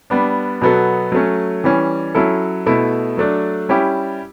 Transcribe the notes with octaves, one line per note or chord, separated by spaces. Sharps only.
G3 B3 D4
B2 F#3 B3 F#4 A4
F#3 A3 C#4
E3 G3 C#4
F#3 C#4 E4 A4
B2 A3 E4
F#3 A3 D4
G3 C#4 E4 G4